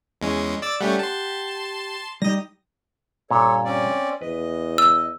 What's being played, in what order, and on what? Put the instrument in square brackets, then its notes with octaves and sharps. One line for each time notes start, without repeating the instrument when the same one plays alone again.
[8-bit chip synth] E2 G#3 C#4
D5 E6 A6
[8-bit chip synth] G3 A3 C#4 [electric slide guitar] G4 F#5
[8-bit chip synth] A5 C6
[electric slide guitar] G3 D#4 G4 [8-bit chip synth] D#5 A#6
[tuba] G2 [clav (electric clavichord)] A#2 [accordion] A4 C#5
[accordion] C4 C#4 D5
[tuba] E2 [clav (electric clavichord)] B4 [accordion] D#5
[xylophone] E6